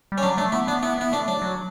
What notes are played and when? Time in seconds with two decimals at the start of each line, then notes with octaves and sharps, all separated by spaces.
0.12 G3
0.18 C#4
0.23 F#3 D4
0.37 A3 D4
0.52 B3 E4
0.67 B3 D4
0.83 B3 E4
0.98 B3 E4
1.12 A3 D4
1.28 F#3 D4
1.42 F#3